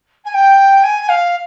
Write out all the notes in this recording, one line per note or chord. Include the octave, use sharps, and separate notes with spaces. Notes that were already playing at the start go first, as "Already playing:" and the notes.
G#5
G5
G#5
F5